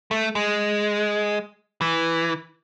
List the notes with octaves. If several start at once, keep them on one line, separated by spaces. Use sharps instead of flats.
A3
G#3
E3